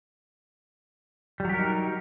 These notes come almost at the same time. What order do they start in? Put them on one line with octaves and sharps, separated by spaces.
G3 F#3 G4 A#4 D#4